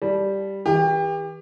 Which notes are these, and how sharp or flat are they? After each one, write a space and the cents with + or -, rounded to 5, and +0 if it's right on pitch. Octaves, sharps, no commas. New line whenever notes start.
G3 +0 A5 -20
E3 -35 G4 +30